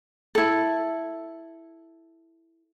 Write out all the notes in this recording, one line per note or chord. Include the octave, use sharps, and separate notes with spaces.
E4 A4